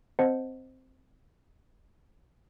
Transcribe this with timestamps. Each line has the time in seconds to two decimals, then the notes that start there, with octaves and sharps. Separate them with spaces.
0.19 C4 C5 D#5 F#5 A5 C#7